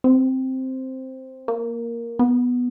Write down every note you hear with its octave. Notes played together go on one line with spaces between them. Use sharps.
C4
A#3
B3